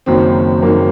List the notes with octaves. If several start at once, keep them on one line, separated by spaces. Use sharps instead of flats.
F#1 F#2 D#3 C4
F#1 F#2 D#3 A#3